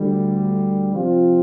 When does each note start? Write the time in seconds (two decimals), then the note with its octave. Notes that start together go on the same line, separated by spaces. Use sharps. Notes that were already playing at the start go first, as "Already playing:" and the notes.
Already playing: D2 D3 G3
0.93 C3 F3 C4 F4